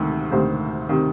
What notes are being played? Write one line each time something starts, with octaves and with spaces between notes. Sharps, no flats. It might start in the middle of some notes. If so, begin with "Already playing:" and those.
Already playing: D2 C3 D#3
D2 C3 D#3 C5
C3 D#3